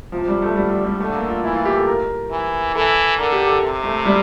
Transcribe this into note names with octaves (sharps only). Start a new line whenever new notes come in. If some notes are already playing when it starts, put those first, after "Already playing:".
C3 F3
G3
A3
D3 G3
G3
G3
D3 A3
A#3
F4
E3 E4
F4
G4
A4
A#4
E3
E3 A4
D3 A#4
G4
A4
C3
A3
G3